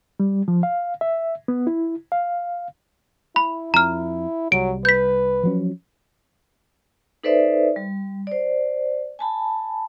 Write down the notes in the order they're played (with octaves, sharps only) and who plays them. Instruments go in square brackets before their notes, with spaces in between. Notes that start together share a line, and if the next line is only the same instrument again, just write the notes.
[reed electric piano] G3
F3
F5
E5
B3
E4
F5
[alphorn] E4 [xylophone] B5
[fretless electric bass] F2 [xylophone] A#5 F6
[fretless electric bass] C2 G3 [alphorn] F#3 [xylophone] D7
[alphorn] B4 [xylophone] G6 B6
[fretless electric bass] F3 F#3 C#4
[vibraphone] D#4 A4 B4 C5 D5 E5
G3
C5 D5
G#5 A5 B5